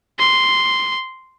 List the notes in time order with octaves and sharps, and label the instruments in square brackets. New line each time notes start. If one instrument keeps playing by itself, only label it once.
[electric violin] C6